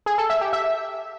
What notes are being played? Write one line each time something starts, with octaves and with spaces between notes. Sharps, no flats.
G#4
A4
E5
G4
E5